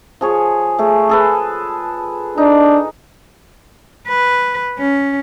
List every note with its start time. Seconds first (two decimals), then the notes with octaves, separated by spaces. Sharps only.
0.21 F3 G#4 C#5
0.78 A3 G#4
1.09 G#4 A4 B4
2.38 D4 D#4
4.08 B4
4.79 C#4